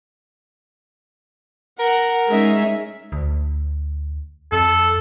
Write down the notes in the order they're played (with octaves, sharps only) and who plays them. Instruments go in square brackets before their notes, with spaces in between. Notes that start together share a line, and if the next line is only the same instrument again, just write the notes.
[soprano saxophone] A#4 [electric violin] F#5
[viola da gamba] G#3 C#4 D#4 [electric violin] G#4 E5
[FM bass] D2
[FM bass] F2 [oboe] A4